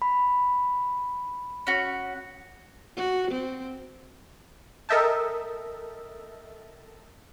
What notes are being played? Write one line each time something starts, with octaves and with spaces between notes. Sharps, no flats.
B5
C#4 F#4
F#4
C4
A4 A#4 D#5 E5 G5 A5